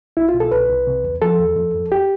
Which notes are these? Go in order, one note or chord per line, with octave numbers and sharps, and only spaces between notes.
C2 E4
F4
B2
A4
C2 B4
C2
C3
E2
F3 A4
E2
F2
F2
G4